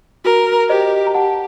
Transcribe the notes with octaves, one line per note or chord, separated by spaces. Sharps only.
F#4 A#4
G4 C5 D#5
A#5
G4 F#5 A5